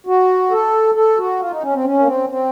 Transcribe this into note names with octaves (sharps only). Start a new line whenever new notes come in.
F#4
A4
A4
F#4
F4
D#4
C#4
C4
C#4
A#3
C4
C4